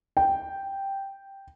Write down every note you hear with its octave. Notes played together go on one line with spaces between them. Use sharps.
G5